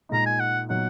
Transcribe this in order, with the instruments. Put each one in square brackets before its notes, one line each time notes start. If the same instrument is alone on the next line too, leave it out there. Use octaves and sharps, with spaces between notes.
[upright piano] A#2 G#3 D#4 [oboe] A#5
[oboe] G#5
F#5
[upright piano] A#2 F#3 B3 D#4 [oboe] F#5